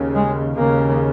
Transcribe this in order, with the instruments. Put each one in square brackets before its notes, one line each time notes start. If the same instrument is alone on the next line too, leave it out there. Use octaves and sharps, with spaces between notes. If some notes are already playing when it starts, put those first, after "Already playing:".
Already playing: [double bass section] D#2 C#3
G#3
D#2 C#3 A#3